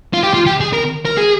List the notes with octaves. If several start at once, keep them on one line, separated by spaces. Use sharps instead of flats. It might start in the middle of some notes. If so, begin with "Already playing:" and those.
F4
G4
F4
G4
G#4
A#4
A#4
G#4